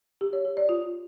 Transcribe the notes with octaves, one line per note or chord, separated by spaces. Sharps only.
G4
C#5
G4
D5
F4